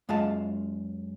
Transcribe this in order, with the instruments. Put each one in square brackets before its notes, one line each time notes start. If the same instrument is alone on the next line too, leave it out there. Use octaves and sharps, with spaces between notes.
[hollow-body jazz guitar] F#2 G#3 F4 F5 A5